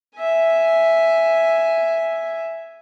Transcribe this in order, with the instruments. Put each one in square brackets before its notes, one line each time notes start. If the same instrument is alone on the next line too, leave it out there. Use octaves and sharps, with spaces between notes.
[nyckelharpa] E5 G#5